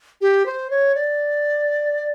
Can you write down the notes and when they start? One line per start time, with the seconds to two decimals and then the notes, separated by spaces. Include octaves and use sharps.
0.21 G4
0.46 C5
0.70 C#5
0.95 D5